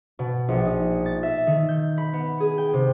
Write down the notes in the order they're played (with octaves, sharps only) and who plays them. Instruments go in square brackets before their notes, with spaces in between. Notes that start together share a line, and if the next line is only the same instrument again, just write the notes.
[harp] B2
A#1
D#4
A6
E5
D#3
G6
B5
B3
G#4
G5
C3